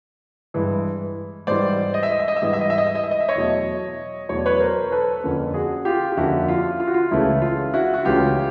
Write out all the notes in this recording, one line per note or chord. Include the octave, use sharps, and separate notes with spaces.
G2 E3 G#3
G#2 E3 G3 C5 D5
D#5
E5
D#5
E5
D#5
E5
G#2 E3 G3 D#5
E5
D#5
E5
D#5
E5
D#5
E5
D#5
E5
C#5 D#5
E2 B2 F#3 A3
E2 B2 F#3 A3 C#5
D5
B4 C#5
A#4 C5
A4 B4
F2 D3 F3 A#3 C#4
F#4 G#4
F4 G4
G4
F2 D3 F3 A#3 C#4 E4 F#4
F4
F4
F#4
F4
C#2 C#3 E3 A3 C#4 E4
F4
E4 F#4
F#4
C#2 C#3 E3 A3 C#4 F4 G4